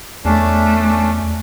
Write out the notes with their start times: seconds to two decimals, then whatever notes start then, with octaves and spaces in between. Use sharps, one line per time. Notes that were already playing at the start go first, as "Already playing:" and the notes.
0.25 E2 A3 C#4 D4